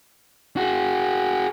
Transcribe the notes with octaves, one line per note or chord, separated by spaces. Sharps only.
F#4 G#4